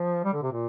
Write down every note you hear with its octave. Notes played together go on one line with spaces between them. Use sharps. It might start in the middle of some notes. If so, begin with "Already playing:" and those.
Already playing: F3
G3
D3
C3
A#2